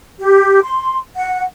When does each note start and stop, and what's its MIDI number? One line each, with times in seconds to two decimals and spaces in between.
0.19 0.60 67
0.63 0.97 84
1.15 1.42 78